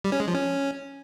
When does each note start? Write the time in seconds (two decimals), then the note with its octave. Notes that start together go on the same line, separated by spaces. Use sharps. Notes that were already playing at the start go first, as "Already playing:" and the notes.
0.04 G3
0.12 C#4
0.20 G#3
0.28 F3
0.35 C#4